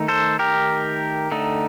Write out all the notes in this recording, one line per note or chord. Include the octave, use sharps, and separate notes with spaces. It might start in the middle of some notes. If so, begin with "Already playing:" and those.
Already playing: D#3 A3 D#4
A4 C5
G4 A#4
D3 A3 D#4